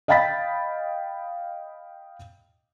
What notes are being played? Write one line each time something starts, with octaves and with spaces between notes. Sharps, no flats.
D#5 F5 G5 B5 A6 B6